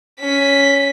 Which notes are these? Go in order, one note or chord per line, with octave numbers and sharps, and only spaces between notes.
C#4 B6